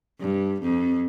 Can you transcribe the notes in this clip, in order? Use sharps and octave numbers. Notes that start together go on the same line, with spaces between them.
G2
F2